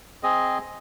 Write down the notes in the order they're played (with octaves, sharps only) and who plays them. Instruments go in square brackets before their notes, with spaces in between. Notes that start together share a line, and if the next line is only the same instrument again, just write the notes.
[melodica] C4 G#4 D#5